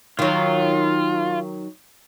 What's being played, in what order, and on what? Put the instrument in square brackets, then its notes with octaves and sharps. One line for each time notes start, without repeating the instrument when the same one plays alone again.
[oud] D#3 F#3 [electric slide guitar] F4